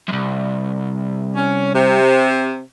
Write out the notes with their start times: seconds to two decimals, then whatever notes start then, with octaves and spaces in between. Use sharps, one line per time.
0.09 C2 F#2
1.36 C#4
1.75 C3